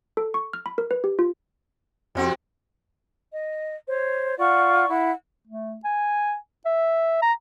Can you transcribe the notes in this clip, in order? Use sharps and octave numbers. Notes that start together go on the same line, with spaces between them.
A4
C#6
F6
B5
A#4
B4
G4
F4
F2 C3 C4 F#4
D#5
C5 C#5
F4 D5 F#5 C#6
E4 F#5
A3
G#5
E5
A#5